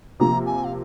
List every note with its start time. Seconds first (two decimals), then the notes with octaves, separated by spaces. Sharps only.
0.20 C3 F3 A#3 F4 A#5
0.46 G#5
0.64 F5